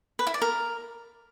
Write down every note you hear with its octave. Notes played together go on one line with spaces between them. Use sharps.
B4
E4
D5
A#4